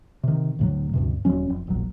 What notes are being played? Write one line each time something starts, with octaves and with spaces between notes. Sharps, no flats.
C3 D#3
D2 A2 F#3
D2 G2 C3
D#1 F2 F#3 C#4
F1
E1 A#1 F#3